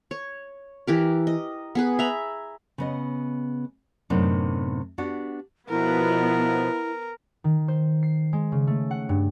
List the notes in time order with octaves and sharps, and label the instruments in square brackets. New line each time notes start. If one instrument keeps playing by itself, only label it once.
[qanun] C#5
E3 G4 A#4
D#5
B3 G#4 B4
E5 A#5 B5
[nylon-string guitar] C#3 B3 D#5
F#2 A2 C3 B3 D4 D#4
B3 D4 F#4 G4 D5
[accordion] B2 F3 [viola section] B3 [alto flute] E4 [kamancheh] A#4
[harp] D#3
C5
C7
G#3
C#3
A3
F#5
G2